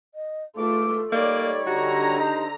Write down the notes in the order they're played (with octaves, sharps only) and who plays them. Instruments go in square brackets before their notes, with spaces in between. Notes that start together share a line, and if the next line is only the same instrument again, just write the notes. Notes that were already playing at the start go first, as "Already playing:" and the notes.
[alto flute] D#5
[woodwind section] E2 G#2 D6 [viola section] A3 F4 [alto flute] A4
[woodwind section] G3 D#4 C#5 [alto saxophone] A#3 [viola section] D5
[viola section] D3 A#5 [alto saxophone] F#4 [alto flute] G4
[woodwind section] D#4 C5